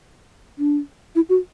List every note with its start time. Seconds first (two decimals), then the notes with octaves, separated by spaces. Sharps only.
0.59 D4
1.15 E4
1.29 F#4